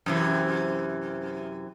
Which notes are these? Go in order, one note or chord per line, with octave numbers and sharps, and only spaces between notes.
F#2 C3 E3